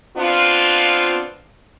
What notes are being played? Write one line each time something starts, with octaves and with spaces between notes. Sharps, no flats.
B3 C4 D4 F4